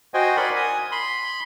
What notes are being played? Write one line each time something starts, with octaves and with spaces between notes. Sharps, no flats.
F#4 C5 D#5 G5 G#5
A#4 D5 F#5 B5 C6
G#5 D#6
B5 C6